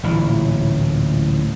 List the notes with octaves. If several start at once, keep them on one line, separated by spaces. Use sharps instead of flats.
D1 A1 A#2 E3